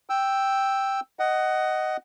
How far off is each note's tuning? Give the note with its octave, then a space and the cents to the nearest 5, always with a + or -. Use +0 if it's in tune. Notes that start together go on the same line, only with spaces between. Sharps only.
G5 +0 E6 +0
D#5 +0 F#5 +15